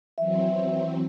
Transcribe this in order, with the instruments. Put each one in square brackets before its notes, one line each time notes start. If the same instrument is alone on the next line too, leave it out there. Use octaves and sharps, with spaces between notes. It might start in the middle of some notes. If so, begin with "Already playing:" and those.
[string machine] E3 F#3 C4 [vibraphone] E5